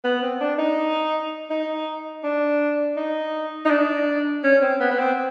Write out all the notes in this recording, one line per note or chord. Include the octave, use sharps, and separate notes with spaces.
B3
C4
D4
D#4
D#4
D4
D#4
D#4
D4
C#4
C4
B3
B3
C4